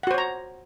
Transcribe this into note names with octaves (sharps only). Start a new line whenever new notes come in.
F#4 C5 C#5 F#5 A#5